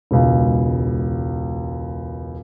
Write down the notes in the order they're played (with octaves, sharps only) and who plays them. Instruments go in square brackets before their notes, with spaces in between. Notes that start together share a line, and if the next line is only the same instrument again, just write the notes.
[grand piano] E1 C#2